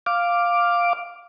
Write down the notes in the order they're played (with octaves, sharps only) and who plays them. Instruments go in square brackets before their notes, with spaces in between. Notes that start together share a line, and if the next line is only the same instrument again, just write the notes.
[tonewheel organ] F5 D6